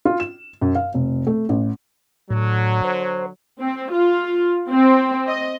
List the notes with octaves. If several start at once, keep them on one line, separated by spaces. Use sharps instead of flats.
F4
E7
F#2
F5
F1
A3
A1
A2 D3 F#3
C5
C4
F4
C4
D#5